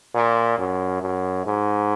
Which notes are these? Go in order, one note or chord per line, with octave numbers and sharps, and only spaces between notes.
A#2
F#2
F#2
G#2